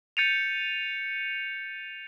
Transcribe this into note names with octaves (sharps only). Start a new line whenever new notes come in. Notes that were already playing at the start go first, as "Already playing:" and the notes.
G6 A6 C#7 D#7 F7